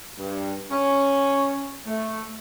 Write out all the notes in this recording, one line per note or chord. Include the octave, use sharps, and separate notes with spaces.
G2
C#4
A3